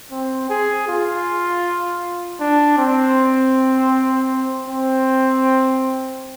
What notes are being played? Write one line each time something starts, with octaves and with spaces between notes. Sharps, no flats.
C4
G#4
F4
D4
C4
C4